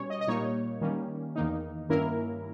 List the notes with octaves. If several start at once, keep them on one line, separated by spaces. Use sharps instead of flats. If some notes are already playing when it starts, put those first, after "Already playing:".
Already playing: B2 G3 C#4 C#5
D#5
D#5
A#2 G3 A#3 D#4 C#5
D#3 G3 A#3 C#4
E2 D#3 A#3 D#4
G2 D#3 A#3 C#4 E4 A#4